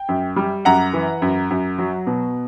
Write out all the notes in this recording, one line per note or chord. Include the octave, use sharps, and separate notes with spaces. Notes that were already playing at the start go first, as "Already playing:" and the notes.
Already playing: G5
F#2
G3
F#2 F#5 A#5
E3
F#2
F#2
F#3
B2